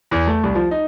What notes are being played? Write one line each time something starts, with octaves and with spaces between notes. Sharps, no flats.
E2
A3
C2
F3
D#4